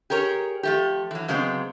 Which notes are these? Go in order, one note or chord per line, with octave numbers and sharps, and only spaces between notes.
G4 G#4 A#4 C#5
F3 A3 G4
E3 F#3
C#3 F#3 G#3 B3 C4